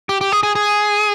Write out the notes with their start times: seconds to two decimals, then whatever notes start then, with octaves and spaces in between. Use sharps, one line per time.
0.09 G4
0.21 G4
0.32 G#4
0.43 G#4
0.55 G#4